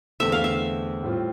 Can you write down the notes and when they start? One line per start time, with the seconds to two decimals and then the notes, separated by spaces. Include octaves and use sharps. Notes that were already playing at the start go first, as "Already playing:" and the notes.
0.20 E2 D3 A3 C4 E5
0.32 F5
0.44 E5
1.03 A2 G3 C4 F4